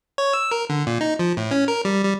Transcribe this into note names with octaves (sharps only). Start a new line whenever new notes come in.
C#5
E6
A#4
D3
A#2
D#4
F3
A2
C#4
A#4
G3
G3